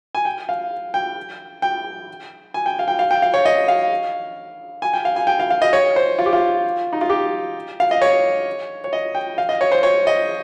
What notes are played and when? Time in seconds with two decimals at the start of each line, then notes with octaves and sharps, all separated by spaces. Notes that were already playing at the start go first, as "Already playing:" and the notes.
0.15 G#5
0.25 G5
0.49 F5
0.94 G5
1.62 G5
2.54 G#5
2.66 G5
2.79 F5
2.88 G5
2.99 F5
3.11 G5
3.22 F5
3.34 C#5
3.45 D#5
3.68 F5
4.82 G#5
4.94 G5
5.05 F5
5.16 G#5
5.27 G5
5.40 F5
5.51 F5
5.62 D#5
5.73 C#5
5.96 C5
6.19 F4
6.26 G4
6.33 F4
6.93 D#4
7.01 F4
7.10 G4
7.80 F5
7.91 D#5
8.02 C#5
8.84 C#5
8.93 D#5
9.15 G5
9.38 F5
9.49 D#5
9.61 C#5
9.72 C5
9.83 C#5
10.07 D#5